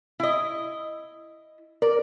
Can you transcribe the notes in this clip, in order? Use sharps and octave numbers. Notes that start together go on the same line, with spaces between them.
E4 D#5
A#4 D5